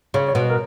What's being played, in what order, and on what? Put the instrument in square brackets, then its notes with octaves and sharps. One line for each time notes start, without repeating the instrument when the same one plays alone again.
[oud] C#3 [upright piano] C#5
[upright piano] C#5
[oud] B2
[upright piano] A#4